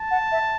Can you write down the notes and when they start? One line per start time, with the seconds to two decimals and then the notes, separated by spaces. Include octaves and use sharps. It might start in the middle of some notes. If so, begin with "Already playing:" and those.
Already playing: A5
0.11 F#5
0.32 E5